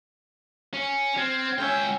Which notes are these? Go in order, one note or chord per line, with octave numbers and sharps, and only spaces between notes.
C#4
C4 F6 G#6
C#2 C#4 E5 G5